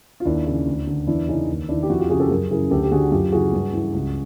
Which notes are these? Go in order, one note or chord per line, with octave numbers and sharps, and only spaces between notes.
F4
D#2 D4 E4
C#3 E3
D2
D3
E2 D4 E4
C#3 E3 C#4 D#4
D#2
D#3 D4 E4
G4
F2 E4 F#4
F4 G4
C#3 E3 F#4 G#4
G4 A4
F#2 G#4 A#4
C#3 E3 G#4 A#4
D2 G4 A4
G4
D3 F#4 G#4
F#2 F4 G4
C#3 E3 F#4 G#4
G2
E3
C#2